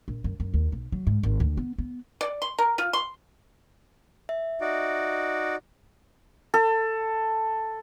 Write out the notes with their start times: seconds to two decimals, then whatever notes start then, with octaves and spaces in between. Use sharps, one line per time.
0.08 A#1
0.24 F#2
0.40 F#2
0.54 D#2
0.72 B1
0.92 F#3
1.07 G#2
1.23 G#1
1.40 D2
1.57 B3
1.78 B3
2.21 D5
2.42 C6
2.58 A#4
2.78 F4
2.93 C6
4.29 E5
4.61 D#4 F#4 D5
6.54 A4